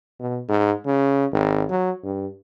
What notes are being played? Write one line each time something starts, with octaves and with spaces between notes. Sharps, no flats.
B2
G#2
C#3
G#1
F#3
G2